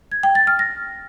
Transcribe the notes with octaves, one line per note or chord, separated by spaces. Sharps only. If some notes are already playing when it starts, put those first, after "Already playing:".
G#6
G5
A6
F6
A#6